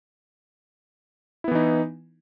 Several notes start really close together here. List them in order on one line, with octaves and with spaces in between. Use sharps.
E4 B3 E3 D#4